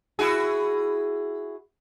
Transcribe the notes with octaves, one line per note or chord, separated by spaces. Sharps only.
E4 F#4 G#4